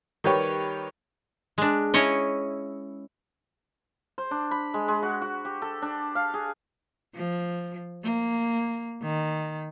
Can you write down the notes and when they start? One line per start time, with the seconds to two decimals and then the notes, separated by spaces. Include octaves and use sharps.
0.24 D#3 G3 G4 B4 C#5 G5
1.58 G#3 D4
1.94 C#4 E4 C#5 D#5
4.18 C5
4.31 D4
4.51 B5
4.74 G#3
4.88 G#3
5.03 F#4
5.21 F#4
5.45 G4
5.62 A4
5.82 D4
6.15 F5
6.34 G#4
7.15 F3
8.03 A#3
9.03 D#3